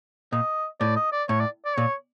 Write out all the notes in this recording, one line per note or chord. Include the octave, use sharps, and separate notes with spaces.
A#2 D#5
A2 D5
D#5
D5
A2 C#5
D5
D5
A#2 C#5